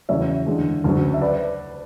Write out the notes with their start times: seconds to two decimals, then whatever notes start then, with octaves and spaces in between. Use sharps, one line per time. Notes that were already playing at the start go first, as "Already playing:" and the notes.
0.09 E2 C#3 F#3 C#5 E5
0.46 E2 D3 G#3
0.84 D2 C#3 F#3
1.14 E5
1.21 B4 D5